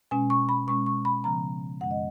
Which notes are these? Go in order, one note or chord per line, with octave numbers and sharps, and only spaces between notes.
B2 G#3 C#4 G#5
C#6
B5
B2 G#3 C#4 C#6
C#6
B5
C#3 F3 B3 A#5
F#2 D#3 G#3 C#4 F#5
D#5